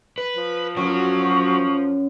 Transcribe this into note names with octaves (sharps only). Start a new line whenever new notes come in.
B4
F3
F#2 F#3 C5 C#5 C#6